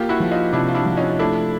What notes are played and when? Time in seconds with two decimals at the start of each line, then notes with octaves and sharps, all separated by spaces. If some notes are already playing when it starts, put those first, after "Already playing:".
Already playing: A#3 F4 G4
0.09 E4 F#4
0.20 F3
0.31 D#4 F4
0.53 C3 D4 E4
0.68 F4
0.75 D4 E4
0.86 F3
0.97 C#4 D#4
1.19 A3 D4 E4